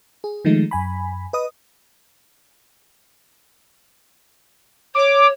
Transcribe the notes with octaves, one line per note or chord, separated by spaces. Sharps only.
G#4
D#3 F3 G#3 A3 D#4
F#2 G#5 B5
B4 D#5 D#6
C#5 D6